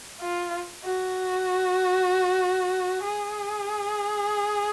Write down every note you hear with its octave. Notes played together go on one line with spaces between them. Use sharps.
F4
F#4
G#4